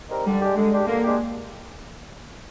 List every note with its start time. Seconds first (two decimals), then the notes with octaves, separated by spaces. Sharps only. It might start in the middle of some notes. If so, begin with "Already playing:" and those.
0.09 G3 C4 D#4 A#4
0.25 D3 G3
0.41 G#3 D4 G4
0.57 D3 G#3
0.71 G#3 D4 G4
0.87 D3 A#3
1.03 G#3 D4 G4